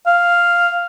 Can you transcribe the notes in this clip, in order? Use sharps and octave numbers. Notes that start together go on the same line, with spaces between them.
F5